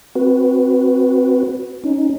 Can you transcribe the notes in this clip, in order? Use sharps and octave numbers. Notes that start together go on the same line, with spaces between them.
C4 F#4 B4
C#4 D#4